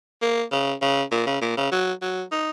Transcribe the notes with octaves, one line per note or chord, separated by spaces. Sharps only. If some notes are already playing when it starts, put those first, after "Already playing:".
A#3
C#3
C#3
A#2
C#3
A#2
C#3
F#3
F#3
D#4